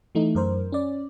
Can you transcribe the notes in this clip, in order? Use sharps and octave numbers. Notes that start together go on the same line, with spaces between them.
E3 A3 D#4
F#2 A#4 C5
C#4 D5